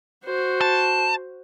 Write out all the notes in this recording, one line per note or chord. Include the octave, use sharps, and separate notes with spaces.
F#4 C5
A5